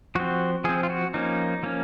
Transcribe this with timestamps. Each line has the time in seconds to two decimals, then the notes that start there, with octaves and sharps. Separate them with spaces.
0.15 F3 C4 F#4
0.64 F3 C4 G#4
0.83 F4
0.90 F#4
1.14 F3 A#3 C#4 D#4
1.63 F3 A#3 C#4